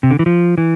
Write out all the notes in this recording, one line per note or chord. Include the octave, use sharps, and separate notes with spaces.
C3
D3
E3
F3
E3